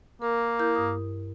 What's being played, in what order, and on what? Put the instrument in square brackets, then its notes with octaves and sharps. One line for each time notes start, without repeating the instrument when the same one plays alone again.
[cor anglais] A#3 [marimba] A#4
[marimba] E4 A#4 G6
G2 D#6